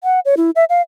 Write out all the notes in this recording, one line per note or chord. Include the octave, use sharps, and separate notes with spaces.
F#5
C#5
E4
E5
F5